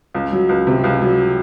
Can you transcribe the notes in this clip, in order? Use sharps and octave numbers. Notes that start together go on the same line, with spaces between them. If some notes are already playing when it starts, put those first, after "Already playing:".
C#2
F#3
C#2
C3
C#2
F#3